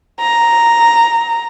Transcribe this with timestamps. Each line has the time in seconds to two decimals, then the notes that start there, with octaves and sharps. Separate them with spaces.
0.20 A#5